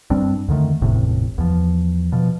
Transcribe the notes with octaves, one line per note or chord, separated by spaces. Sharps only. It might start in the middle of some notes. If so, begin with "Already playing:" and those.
G2 G3 C4 D4
F2 D3 D#3 A3
G1 E2 A2 C3
E2 F3
B2 F3